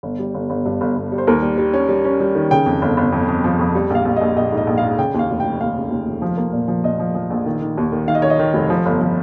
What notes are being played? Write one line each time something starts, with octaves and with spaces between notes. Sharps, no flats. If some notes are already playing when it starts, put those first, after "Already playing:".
G1
G3
G1
G1
G2
G1
G1
G3
C5
D#2 A#4
G3
G3
C#4
G3
C#4
G3
D#3
C#3 G5
F2
G1
G1
F2
F2
F3
F2
G3
A#1 F5
A#1
A#1 D#5
A#1 D#5
G#2
D#5
A#1
F5
G#2
C#3 G5
D#2
F5
F1
F1 G5
D#2 F5
C#3
D#2
F1
F3
A#3
A#2
F3
A#2 D#5
F3
F3
A#1
D#3
D#3
D#2
D#3
D#3 F5
D#5
D#3 C#5
D#5
D#3
F1
F3
G1
F3